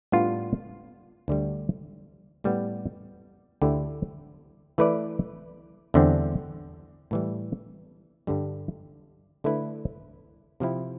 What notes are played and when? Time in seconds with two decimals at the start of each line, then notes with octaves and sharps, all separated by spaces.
0.12 A2 G3 B3 D4 F4
1.28 D2 D3 G3
2.44 A2 G3 B3
3.62 D2 D3 A3 E4 G4
4.78 E3 A3 E4 B4 D5
5.94 E2 D3 G3 C4
7.11 A2 E3 G3
8.27 G2 D3 G3
9.44 D3 A3 E4 B4
10.60 C3 F3 C4 E4